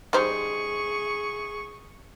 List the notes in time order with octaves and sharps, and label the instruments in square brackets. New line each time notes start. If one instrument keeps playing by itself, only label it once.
[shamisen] G3 D#4 C5 [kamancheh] G#4 C#6